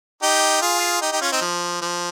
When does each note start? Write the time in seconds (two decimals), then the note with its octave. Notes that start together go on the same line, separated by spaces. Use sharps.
0.22 D#4 G4
0.62 F4 G#4
1.01 D#4 G4
1.12 D#4 G4
1.21 C#4 F4
1.32 C4 D#4
1.41 F3
1.81 F3